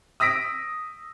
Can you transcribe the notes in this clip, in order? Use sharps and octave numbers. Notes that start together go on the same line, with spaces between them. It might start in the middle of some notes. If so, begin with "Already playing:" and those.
D#6 E6 A#6 B6 D7